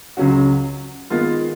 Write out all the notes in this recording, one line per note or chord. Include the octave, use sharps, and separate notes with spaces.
C#2 C#3 F#3 C#4 F#4
D#3 G#3 B3 F4